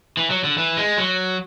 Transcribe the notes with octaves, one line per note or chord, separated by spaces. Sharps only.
E3
F#3
D3
E3
G#3
F#3